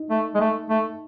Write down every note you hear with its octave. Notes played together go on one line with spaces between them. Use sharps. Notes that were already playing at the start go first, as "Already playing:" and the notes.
Already playing: D#4
A3
G#3
A3
A3